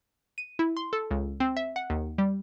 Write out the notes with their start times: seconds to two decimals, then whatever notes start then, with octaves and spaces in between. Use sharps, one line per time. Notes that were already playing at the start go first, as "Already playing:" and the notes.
0.38 D#7
0.59 E4
0.77 C6
0.93 A4
1.11 C#2
1.40 C4
1.57 E5
1.76 F#5
1.90 D#2
2.18 G3